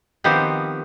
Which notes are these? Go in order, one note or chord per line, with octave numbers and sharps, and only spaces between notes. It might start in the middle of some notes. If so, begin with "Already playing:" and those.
D#3 F3 B3 C4 G4